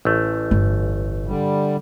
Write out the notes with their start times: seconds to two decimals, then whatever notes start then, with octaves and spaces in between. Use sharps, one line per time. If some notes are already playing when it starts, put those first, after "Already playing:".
0.05 A1 A3
0.51 G1
1.27 D3 G3